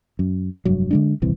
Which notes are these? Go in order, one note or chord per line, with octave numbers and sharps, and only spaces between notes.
F#2
F1 G2 F#3
D3 G#3 D4
D#1 C2 E3 C4